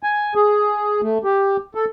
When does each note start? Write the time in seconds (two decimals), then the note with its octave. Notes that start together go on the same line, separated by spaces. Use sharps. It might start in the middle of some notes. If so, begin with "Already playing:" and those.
0.03 G#5
0.35 G#4
1.02 A3
1.24 G4
1.75 A4